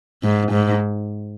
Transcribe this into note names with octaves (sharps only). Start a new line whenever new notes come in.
G#2
G#2